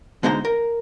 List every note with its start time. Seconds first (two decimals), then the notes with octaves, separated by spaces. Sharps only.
0.23 B2 D3 G#3 D#4 C5 A#5
0.45 A#4